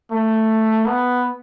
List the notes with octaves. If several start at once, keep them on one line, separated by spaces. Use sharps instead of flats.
A3
B3